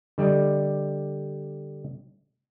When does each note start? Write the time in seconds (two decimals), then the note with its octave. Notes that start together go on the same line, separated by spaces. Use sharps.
0.18 D3 G3 D5 D#5